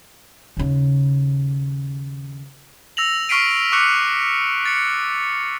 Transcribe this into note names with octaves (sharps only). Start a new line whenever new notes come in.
D#2 C#3
E6 A#6 F7 F#7
C#6 F6 B6 C7 D7 D#7
C#6 D6 F#6 C#7
A6 C#7